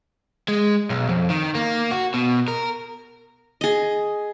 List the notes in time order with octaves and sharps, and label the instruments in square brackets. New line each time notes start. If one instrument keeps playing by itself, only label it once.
[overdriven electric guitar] G#3
B1
F2
D#3
A#3
F#4
B2
A#4
[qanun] G#4 D#5